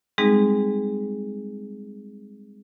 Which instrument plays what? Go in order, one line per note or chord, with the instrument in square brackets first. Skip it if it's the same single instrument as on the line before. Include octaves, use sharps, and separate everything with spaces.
[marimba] G3 G#3 C4 D#4 G#4